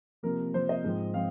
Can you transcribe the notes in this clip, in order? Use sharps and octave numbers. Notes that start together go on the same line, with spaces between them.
C3 F3 A#3 A#4
C3 F3 A#3 C5
D#5
G#2 F3 C4
F3 C4 F5